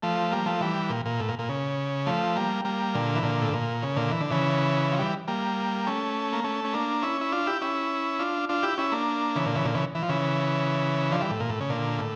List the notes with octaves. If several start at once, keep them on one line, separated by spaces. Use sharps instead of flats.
F3 A3
G3 A#3
F3 A3
E3 G3
A#2
A#2
A2
A#2
A#2
C#3
F3 A3
G3 A#3
G3 A#3
A#2 D3
E3
A#2 D3
A2
A#2
C#3
A#2 D3
E3
D3
C#3 E3
F3
E3 G3
G3 A#3
A3 C#4
A#3
A3 C#4
C#4
A#3 D4
C#4 E4
E4
D4 F4
E4 G4
C#4 E4
D4 F4
D4 F4
E4 G4
C#4 E4
A#3 D4
C#3 E3
A#2 D3
C#3 E3
A#2 D3
C#3 E3
E3
F3
C#3 E3
D3 F3
E3 G3
A2
A#2
A2
C#3
A#2 D3
A2